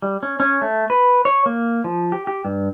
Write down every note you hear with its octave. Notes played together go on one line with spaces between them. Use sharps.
G3
C#4
C#4
A3
B4
C#5
A#3
F3
G4
G4
G2